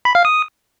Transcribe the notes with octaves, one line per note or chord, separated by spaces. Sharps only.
B5
F5
D#6